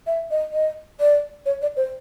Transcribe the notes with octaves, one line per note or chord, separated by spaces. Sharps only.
E5
D#5
D#5
D5
C#5
D5
C5